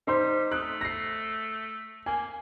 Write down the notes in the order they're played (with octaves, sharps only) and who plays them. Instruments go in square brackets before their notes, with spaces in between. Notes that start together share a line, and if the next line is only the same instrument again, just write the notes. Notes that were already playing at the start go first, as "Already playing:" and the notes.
[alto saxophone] G3 [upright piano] D#4 C5 C6
[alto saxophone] A3 [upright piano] D#6 F#6
[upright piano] A#6 C7
[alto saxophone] A#3 [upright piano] G#5